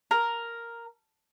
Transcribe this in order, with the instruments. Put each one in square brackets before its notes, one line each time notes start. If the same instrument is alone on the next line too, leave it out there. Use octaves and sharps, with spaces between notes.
[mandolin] A#4